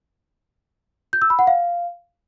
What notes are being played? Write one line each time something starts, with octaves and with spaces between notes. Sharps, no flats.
G6
E6
B5
F#5
F5